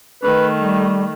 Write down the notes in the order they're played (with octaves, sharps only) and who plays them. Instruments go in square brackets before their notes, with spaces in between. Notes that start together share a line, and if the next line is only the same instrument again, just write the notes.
[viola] D#3 A3 [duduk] B4
[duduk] G3